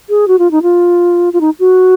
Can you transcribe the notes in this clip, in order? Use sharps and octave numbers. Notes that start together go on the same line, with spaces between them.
G#4
F#4
F4
D#4
F4
F4
D#4
F#4